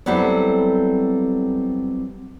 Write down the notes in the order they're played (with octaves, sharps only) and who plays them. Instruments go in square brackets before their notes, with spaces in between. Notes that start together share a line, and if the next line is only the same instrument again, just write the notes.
[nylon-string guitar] F#3 G3 B3 C4 E4 A4